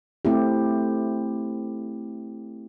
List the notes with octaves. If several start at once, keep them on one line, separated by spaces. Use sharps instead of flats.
A3 C4 E4 G4